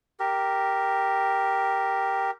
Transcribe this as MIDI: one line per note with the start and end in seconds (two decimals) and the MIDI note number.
0.20 2.31 67
0.20 2.31 70